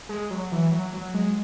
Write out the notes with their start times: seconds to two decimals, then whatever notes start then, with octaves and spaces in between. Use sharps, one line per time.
0.09 G#3
0.31 F#3
0.52 E3
0.72 F#3
0.93 F#3
1.14 G#3